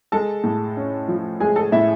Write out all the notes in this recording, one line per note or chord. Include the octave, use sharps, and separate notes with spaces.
G#3 A4 A5
A2
C#4
F3
G#3 G#4 G#5
A4 A5
A2 E4 E5